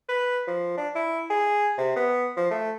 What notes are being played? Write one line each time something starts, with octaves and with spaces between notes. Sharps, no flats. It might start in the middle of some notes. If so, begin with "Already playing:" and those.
B4
F3
D4
E4
G#4
C3
B3
F3
A3